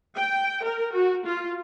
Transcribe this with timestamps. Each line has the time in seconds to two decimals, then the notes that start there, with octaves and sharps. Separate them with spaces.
0.16 G5
0.64 A#4
0.93 F#4
1.25 F4